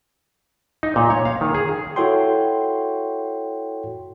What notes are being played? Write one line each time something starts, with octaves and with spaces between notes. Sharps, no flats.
D#4
A#2
C#5
F5
D#3
G#4
E4 F#4 A4 C#5 G5 C6